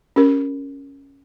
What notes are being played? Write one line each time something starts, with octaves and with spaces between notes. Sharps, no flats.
C#4 G4 A#4